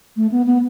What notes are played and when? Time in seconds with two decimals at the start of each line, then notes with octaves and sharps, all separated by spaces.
0.17 A3
0.32 B3
0.47 B3